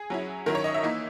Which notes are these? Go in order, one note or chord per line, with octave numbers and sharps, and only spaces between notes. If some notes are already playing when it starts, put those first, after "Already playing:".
Already playing: G#4
F#3 C#4 E4
D#3 F#3 C#4 E4 A#4
C#5
D#5
E5
E3 A#3 D#4